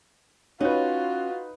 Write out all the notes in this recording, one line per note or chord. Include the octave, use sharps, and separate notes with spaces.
C#4 D#4 F4 F#4 B4